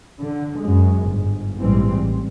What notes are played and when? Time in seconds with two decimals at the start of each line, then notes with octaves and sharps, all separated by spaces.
0.20 D3
0.59 F#2 G#3
1.03 G1 G#2
1.60 A#1 G#2 E3 G3 G#3 C4
1.99 A1